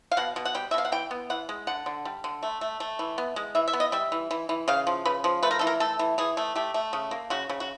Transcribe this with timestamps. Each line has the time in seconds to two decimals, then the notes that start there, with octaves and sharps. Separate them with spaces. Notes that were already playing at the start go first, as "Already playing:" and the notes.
0.12 F5
0.17 B2 F#5
0.36 B2
0.45 F#5
0.55 G3 G5
0.71 E5
0.74 B2 F5
0.85 F#5
0.92 E3 G5
1.11 B3
1.30 E3 F#5
1.49 G#3
1.67 D3 F#5
1.86 D3
2.05 G3
2.24 D3
2.43 A3
2.61 A3
2.80 A3
2.99 E3
3.18 B3
3.36 G#3
3.55 E3 E5
3.68 E5
3.73 B3
3.80 D#5
3.92 G3 E5
4.12 E3
4.31 E3
4.49 E3
4.68 C#3 F5
4.87 F3
5.05 C#3 B4
5.24 F3
5.43 A3 B4
5.51 A#4
5.59 E3 A4
5.67 A#4
5.80 A3 A4
5.99 E3
6.18 E3 G#4
6.37 A3
6.56 A3 G4
6.74 A3
6.93 C#3
7.11 A#3
7.30 C#3 F#4
7.49 C#3
7.60 F#4